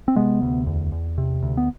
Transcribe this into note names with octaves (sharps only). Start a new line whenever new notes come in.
C4
C3 G#3 B3
D2
E2
E2
C3
D2
B3